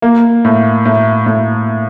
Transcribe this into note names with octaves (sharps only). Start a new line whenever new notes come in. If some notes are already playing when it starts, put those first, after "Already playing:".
A#3
A2
A2
A2